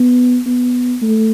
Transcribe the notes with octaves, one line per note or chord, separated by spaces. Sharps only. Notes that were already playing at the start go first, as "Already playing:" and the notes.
Already playing: B3
B3
A3